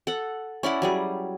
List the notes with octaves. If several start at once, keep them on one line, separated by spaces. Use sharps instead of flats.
A4 F#5
C#4 E4 D5 F#5
F#3 G3 G#4